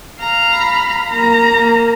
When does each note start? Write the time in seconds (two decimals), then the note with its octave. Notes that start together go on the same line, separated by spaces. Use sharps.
0.20 F5 A#5
0.54 B5
1.10 A#3 A#5
1.54 A#3